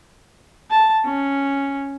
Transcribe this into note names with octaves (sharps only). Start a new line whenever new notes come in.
A5
C#4